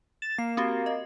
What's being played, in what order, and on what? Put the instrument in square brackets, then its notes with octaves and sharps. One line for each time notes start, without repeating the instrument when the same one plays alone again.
[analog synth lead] A6 [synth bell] E7
[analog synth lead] A#3 [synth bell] C7
[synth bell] C4 F#4 G4
D#5